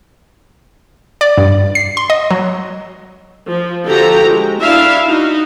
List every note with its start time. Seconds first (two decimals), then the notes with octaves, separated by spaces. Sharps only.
1.21 D5
1.38 G2
1.75 C7
1.97 C6
2.10 D#5
2.30 F#3
3.49 F3
3.86 D3 F3 F#4 G4 A4 A#5
4.25 G#3
4.60 D4 E4 E5 F5
5.07 D#4 F#4